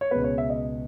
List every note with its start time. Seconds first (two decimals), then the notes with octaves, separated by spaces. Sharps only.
0.01 C#5
0.11 C#2 B2 G#3 B3 B4
0.24 C#5
0.38 E5
0.50 D#5